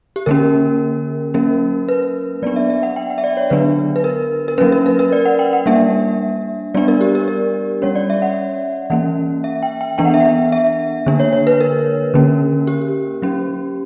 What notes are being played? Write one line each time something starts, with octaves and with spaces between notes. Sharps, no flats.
G4
D3 A#3 C#4 A#4
F#3 A#3 C#4 A#4
B4
F#3 B3 D4 D5
E5
E5
F#5
G5
F#5
E5
D5
C#5
D3 F#3 B3 D4 B4
B4
A#4
A#4
F#3 A#3 C#4 B4
A#4
B4
A#4
D5
F#5
G5
F#5
G3 A#3 D4 E5
G3 B3 D4 D5
A#4
G4
A#4
A#4
G3 C#4 C#5
D5
E5
F#5
E3 A#3 C#4 F#5
E5
G5
G5
E3 B3 D4 G5
F#5
E5
F#5
E5
D3 A#3 D4
C#5
C#5
B4
A#4
D3 A#3 C#4
G4
F#3 C#4